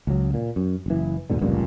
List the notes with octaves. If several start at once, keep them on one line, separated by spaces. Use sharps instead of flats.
C#2 F#3
A#2
F#2
F#1 E3
D#2 G#2 B2 D3
F1 C#2 G2 A#2